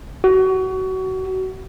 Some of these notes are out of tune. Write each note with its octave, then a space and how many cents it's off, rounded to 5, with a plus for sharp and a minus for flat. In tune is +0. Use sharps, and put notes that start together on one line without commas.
F#4 +25